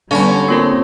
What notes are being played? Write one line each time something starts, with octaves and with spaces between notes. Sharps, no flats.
D3 G3 B3 C#4 F5 A5 B5
A#3 C4 F4 A#4